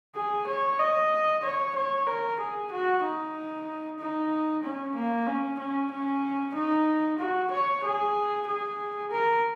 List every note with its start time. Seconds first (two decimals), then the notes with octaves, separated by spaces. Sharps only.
0.15 G#4
0.48 C#5
0.79 D#5
1.43 C#5
1.75 C#5
2.07 A#4
2.39 G#4
2.72 F#4
3.04 D#4
3.99 D#4
4.63 C#4
4.95 A#3
5.27 C#4
5.59 C#4
5.91 C#4
6.55 D#4
7.19 F#4
7.51 C#5
7.84 G#4
8.47 G#4
9.11 A#4